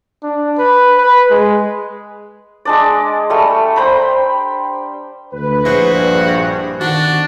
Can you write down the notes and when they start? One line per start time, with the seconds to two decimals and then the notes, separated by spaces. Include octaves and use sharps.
0.23 D4
0.58 B4
0.98 B4
1.30 G#3
2.65 G#3 D4 D5
3.30 G3 A3
3.76 C5 G5 A#5 B5
5.33 D2 B4
5.65 A#1 E4 F#4 G#4 C5
5.94 G2
6.81 F2 B2 D3 D#3 D4 F#4 F#5